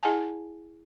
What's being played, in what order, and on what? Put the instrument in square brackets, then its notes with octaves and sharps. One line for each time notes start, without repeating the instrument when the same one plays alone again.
[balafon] E4 G#4 D#5 F#5 G#5 A5